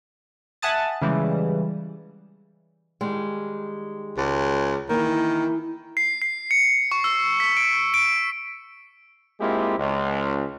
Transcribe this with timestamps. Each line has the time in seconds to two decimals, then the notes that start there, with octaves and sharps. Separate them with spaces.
0.62 E5 F#5 G#5 A5 D#6 A6
1.02 C#3 E3 G3 G#3
3.01 D#3 G3 G#3
4.17 C#2
4.89 D#3 E3 A#3
5.97 C7
6.22 C7
6.51 C#7
6.92 C#6
7.04 E6
7.40 B6
7.57 D7
7.94 D7
9.40 G#3 A#3 C4 E4 F4 G4
9.79 C#2